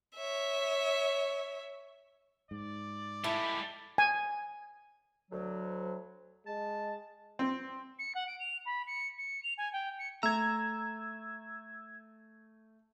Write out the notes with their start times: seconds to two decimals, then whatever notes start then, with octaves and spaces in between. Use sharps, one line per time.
0.15 C#5 E5
2.51 G#2 D5
3.24 G3 G#3 E4 A4
3.98 G#5
5.31 D2 F#3
6.47 G#3 A5
7.39 C4
7.99 C#7
8.15 F#5
8.27 D7
8.39 F7
8.66 B5
8.87 C#7
9.18 C#7
9.43 F7
9.58 G#5
9.73 G5
9.99 C#7
10.23 A3 A#5 E6 G#6